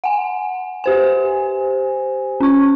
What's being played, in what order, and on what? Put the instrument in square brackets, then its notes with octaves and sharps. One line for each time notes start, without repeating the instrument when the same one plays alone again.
[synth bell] F#5 G#5
G4 C5 G#5
C#4 C#6